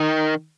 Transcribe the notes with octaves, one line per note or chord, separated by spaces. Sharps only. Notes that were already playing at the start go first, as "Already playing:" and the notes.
Already playing: D#3